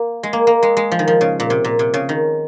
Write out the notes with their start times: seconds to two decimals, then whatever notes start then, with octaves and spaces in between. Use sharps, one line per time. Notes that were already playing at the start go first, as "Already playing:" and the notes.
Already playing: A#3
0.23 G#3
0.33 A#3
0.47 A#3
0.63 G#3
0.77 G#3
0.91 F3
0.99 D#3
1.08 F3
1.21 C#3
1.40 A#2
1.50 C3
1.64 A#2
1.79 C3
1.94 C#3
2.09 D#3